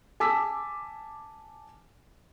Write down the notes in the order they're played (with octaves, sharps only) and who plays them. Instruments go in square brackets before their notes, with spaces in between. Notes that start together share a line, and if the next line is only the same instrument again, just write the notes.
[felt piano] G#5 A5 D6 E6 B6